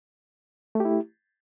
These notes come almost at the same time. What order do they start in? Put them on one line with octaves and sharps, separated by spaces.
A3 G4 E4